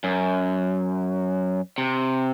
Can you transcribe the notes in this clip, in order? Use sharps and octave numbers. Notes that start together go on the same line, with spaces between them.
F#2
C3